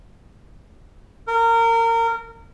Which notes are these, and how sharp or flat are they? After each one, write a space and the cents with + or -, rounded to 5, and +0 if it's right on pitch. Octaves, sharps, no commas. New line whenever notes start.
A#4 -25